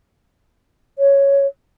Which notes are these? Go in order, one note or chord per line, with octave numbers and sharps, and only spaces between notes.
C#5